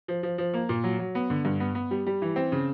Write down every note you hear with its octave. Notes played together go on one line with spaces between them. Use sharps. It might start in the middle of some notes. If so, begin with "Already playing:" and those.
F3
F3
F3
A#3
A#2
F#3
F#3
B3
D3
G2
B3
B3
G3
G3
E3
C4
C#3